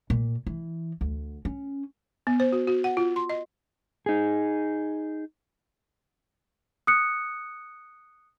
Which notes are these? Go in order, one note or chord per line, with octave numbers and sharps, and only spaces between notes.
A#2
E3
D2
C#4
B3
C5
F#4
F#4
F#5
F4
C6
D#5
D#4 G#4
D#6 F#6 C#7